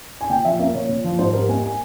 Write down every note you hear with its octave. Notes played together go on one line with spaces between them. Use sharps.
G#5
A#2 G5
F3 E5
A#3 E5
A#2 C#5
A#2
F3
G#2 C5
G3 A#4
A#3 G#5
G#5